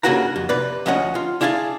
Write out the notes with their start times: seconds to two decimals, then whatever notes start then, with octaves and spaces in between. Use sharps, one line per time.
0.03 G2 C#3 A#3 F#4 F#5 A#5
0.36 F2
0.49 C3 B4 D5
0.86 D2 F3 C#4 D#5 F#5
1.15 F4
1.41 D4 E4 G#4 F5 G#5 A5